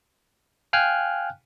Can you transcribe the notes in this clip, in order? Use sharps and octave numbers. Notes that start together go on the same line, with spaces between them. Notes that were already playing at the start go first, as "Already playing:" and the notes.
F5 G5 G#5 F6 F#6